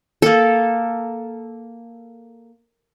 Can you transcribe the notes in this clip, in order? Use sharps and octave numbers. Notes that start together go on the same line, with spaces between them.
A#3 A4